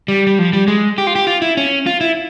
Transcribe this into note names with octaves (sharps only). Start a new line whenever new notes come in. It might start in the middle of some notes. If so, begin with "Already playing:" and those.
G3
G3
F3
G3
G#3
G4
F4
G4
F4
E4
C#4
F4
E4